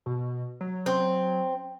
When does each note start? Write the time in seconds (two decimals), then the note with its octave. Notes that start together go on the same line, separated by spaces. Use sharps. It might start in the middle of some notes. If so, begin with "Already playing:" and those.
0.06 B2
0.61 F#3
0.86 C4